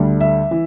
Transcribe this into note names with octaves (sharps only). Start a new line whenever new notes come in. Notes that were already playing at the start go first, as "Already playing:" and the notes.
Already playing: D2 D3 G3
E5
E3